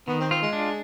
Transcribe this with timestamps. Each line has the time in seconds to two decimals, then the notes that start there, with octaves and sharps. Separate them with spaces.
0.08 D#3 B3
0.20 C4
0.30 C4 F4
0.41 G#3
0.53 D4